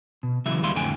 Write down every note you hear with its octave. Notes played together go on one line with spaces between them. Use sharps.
B2
C#3 E3 F#3 G#3 E5
D#2 G3 G#3 E4 F5 C6
F2 A2 D3 G5 G#5